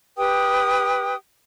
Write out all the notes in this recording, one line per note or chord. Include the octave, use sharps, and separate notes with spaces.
G4 B4 G5 D#6